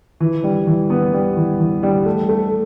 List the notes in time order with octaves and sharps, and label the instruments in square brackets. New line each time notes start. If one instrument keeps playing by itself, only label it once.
[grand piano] E3
G3
E3
B3
G3
E3
E3
G3
A3
A3